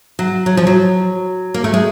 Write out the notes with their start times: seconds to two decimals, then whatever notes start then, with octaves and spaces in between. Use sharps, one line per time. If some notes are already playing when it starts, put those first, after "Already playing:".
0.19 F#3
0.46 F#3
0.57 F3
0.67 F#3
1.54 A#3
1.64 A3
1.74 G#3